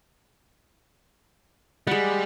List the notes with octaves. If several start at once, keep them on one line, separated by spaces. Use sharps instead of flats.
G3 G#3 F#5